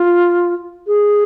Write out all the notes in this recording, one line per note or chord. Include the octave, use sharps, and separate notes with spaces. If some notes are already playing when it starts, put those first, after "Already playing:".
Already playing: F4
G#4